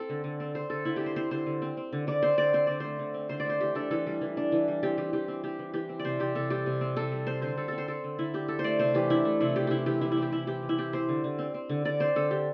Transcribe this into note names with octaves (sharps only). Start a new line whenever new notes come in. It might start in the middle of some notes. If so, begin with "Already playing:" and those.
Already playing: C4 A4
D3
D3
C4
C4 C5
D3 A4
D3 E4
C4 G4
C5
C4 C5
D3 C5
D3
C4
C4
D3
D3 D5
C4 C5
D3 D5
C4 C5
D3 D5
A3 C5
D3
C4
D3 C5
D5
A3 C5
E3 G4
D4 A4
E3 A4
G3
E3
D4
E3
G3
C4 G4
E3 G4
E3 G4
C4
C4 G4
E3
E3 G4
C4
D5
C3 C5
C4 G4
C3 A4
G3 G4
C3
C4
C3 A4
G3
C4 C5
D3 C5
D3 A4
C4 A4
C5
C4 A4
D3
D3 E4
C4 G4
D4 A4
C5
A3 D5
C3 C5
E3 G4
D4 E4
A3
C3 E4
E3 G4
C4 E4 G4
E3 G4
E3 E4
E4
C4
G4
C4 E4
E3 G4
E3
E4
C4 G4
C4 C5
D3
D3
C4
C4
D3
D3 D5
C4 C5
D3 A4
D4 G4